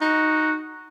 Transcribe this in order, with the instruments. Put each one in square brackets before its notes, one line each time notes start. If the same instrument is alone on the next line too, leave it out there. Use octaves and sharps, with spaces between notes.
[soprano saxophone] D#4 [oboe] F#4